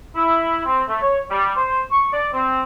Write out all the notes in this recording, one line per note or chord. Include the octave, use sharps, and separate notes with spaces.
E4
C4
A3
C#5
G3
C5
C#6
D5
C4